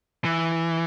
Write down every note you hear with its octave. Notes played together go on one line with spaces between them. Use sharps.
E3